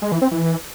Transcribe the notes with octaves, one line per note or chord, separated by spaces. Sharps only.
G#3
E3
C4
E3